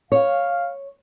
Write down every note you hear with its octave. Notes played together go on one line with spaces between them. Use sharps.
C#5 F5